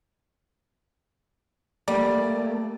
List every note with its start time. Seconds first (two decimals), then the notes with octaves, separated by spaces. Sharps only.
1.88 G3 A3 A#3 D5